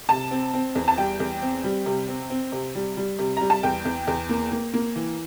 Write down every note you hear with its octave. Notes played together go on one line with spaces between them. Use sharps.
C3 A5
C4
C4
E2
A5
G3 G5
E2
C4
G3
C3
C4
C4
C3
G3
G3
C3
G3 A#5
A5
E2 G5
E2
E2
A#3
A#3
A#3
E3